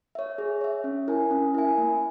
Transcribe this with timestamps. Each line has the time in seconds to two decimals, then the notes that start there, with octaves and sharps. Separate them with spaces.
0.15 C#5 E5
0.38 G#4
0.61 C#5 E5
0.84 C#4
1.08 E4 A#4 E5 G#5
1.31 C#4
1.54 E4 A#4 E5 G#5
1.78 A#3